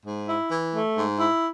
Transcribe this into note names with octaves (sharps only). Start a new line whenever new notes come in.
G#2
E4
E3
A3
G#2
E4